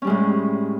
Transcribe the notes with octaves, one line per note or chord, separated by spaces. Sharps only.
A2 G3 G#3 C#4